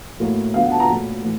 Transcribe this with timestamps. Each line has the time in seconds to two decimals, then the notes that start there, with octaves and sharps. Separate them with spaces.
0.20 A2 F#3 A#3
0.54 D3 F#3 B3 F5
0.63 F#5
0.72 A5
0.80 A#5
0.88 A#2 F#3 A3 B5
1.22 A2 E3